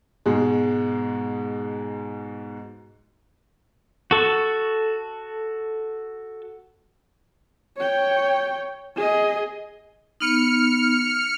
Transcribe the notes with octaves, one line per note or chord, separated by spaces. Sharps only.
G#2 B2 G#3
F#4 A4 C#6
C#5 G5
G#4 D#5
B3 D#4 F6 C#7